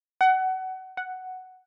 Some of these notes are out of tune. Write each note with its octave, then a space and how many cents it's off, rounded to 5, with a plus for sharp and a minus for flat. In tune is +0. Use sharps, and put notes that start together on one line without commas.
F#5 +25
F#5 +5